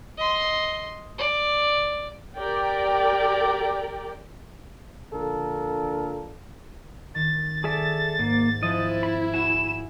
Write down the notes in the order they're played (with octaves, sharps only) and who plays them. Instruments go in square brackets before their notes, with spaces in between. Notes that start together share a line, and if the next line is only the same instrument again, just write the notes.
[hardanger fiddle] D#5 C6
D5
[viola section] G4 A#4 D5 G5
[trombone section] A#1 D3 D4 F4 A4 A#4
[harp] D#3 [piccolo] A6
[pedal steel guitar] G#4 A4 E5 [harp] D5
[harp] G#2 [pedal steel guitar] A#3
[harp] F3 G#3 C4 [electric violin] E4 [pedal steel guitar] D#5
[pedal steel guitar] B5
[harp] F#4 G#5 C#7 [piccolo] E7